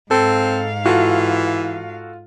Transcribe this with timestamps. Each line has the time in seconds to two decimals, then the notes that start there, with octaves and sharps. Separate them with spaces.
0.11 G#2 C4 A4 F5
0.86 E3 F4 F#4 A4